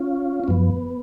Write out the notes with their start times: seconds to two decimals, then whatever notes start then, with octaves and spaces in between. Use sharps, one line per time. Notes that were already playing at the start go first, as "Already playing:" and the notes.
Already playing: C#4 F4
0.44 C#4
0.48 F#2 F3 B3